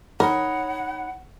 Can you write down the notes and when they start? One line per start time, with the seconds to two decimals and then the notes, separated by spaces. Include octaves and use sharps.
0.20 D#4 A#4 C#5 F#5 B5